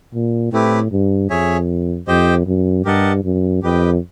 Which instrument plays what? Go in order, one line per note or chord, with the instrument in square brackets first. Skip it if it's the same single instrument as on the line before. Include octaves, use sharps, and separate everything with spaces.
[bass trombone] A#2
[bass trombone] A2 [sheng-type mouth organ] A3 C4 E4 G4 B4
[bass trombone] G2
[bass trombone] F2 [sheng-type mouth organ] G#4 C#5 E5 G#5
[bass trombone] F2 [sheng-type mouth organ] G4 C5 D#5 G5
[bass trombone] F#2
[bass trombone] G2 [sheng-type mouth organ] G4 A#4 D#5 F#5 A5
[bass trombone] F#2
[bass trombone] F2 [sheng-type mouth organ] G4 B4 D#5 G5